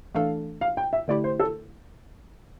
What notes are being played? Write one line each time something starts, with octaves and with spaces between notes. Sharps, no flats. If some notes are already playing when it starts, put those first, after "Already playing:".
E3 A3 D4 A4 F5
F5
G5
E5
D3 A3 E4 G4 D5
C5
A4